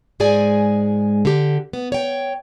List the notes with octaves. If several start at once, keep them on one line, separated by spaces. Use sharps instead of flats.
G#2 G#3 G#4 D5 G#5
D3 G4
B3
C#5 G5